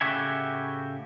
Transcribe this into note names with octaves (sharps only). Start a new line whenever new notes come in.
A2 C#3 F#4 G4 E5 G#5